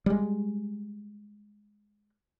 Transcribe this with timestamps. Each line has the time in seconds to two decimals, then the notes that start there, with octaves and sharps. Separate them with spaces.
0.06 G3 G#3